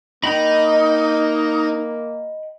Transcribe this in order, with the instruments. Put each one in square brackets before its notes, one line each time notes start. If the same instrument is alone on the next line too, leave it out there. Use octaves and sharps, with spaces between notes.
[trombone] A#3 [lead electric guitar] D#4 [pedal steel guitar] D#5 G5 B5